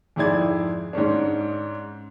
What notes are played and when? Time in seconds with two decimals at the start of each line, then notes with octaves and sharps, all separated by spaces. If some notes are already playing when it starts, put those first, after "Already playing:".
0.16 F2 G#2 E4 G#4 D5 G#6
0.93 G#2 G#3 C#4 D4